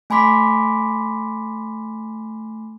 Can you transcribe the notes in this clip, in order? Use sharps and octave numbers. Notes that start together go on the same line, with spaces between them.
A3 G#5 B5 C6 D6 B6